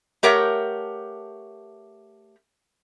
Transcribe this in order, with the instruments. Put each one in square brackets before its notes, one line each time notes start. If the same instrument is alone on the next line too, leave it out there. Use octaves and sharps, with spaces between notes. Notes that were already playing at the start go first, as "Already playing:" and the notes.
[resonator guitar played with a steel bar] A3 G4 A#4 C#5 F#5